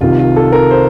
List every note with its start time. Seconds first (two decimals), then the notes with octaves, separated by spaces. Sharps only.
0.01 C2 C3 D#3 F4
0.19 F4
0.36 A4
0.52 A#4
0.71 C5